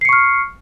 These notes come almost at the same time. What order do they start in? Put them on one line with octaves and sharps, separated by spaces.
C7 C#7 C#6 F6